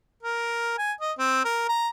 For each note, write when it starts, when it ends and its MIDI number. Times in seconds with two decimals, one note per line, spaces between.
0.23 0.78 70
0.78 0.93 80
1.01 1.12 75
1.18 1.44 60
1.45 1.66 70
1.69 1.89 82